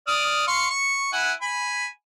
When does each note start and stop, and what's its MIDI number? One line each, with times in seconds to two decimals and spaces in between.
0.07 0.43 74
0.07 0.43 87
0.07 0.43 89
0.47 0.68 77
0.47 0.68 84
0.47 0.68 85
0.70 1.10 85
1.13 1.32 64
1.13 1.32 78
1.13 1.32 80
1.42 1.87 80
1.42 1.87 83